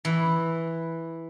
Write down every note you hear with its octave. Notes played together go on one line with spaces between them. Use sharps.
E3